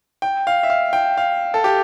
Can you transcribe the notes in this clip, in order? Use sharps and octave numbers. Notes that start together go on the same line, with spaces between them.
G5
F5
E5
F5
G5
F5
A4
G4